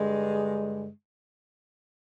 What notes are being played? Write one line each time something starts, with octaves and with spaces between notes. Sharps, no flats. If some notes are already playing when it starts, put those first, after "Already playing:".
Already playing: G2 D3 G#3